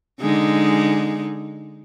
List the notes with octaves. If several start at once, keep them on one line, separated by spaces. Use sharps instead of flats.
D3 G#3 D#4